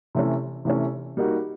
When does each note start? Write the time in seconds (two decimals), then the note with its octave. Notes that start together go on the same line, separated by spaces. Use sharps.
0.15 C3 E3 A3 C#4
0.65 C3 E3 A3 C#4
1.17 G3 A#3 D#4 F#4